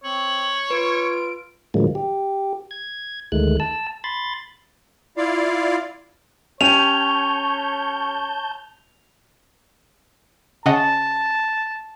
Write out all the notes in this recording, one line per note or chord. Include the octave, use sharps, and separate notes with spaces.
C4 C#5 F#7
F4 B4 D7
A2 D3 F3 F#3 G#3 A#3
G4
G#6
D2 D#3 G#3 A3 F#6
A5 E6
B5 C6 A6
E4 F4 D5 F5
C#4 G4 C#5 A5 G6 D#7 F7
C#3 D#5 F#5 A5